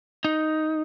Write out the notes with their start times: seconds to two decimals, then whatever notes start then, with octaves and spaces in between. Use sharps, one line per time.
0.25 D#4